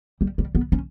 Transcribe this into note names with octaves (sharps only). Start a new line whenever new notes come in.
G3
G3
B3
C#4